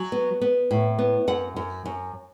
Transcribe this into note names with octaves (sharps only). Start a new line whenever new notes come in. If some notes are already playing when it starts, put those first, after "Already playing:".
Already playing: F#3 G#5
B3
B3
A2
B3
F#2 F#5
F#2
F#2